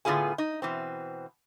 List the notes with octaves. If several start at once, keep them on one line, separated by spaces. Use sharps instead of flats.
A2 D3 B3 F4 G#4 G#5
D#4
B2 E3 C4